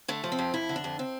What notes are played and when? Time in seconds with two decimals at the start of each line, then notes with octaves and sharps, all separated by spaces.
0.08 D3 A3
0.24 F3
0.32 C4
0.39 F2
0.54 F2 E4
0.69 D3
0.76 D4
0.84 F2
0.99 C4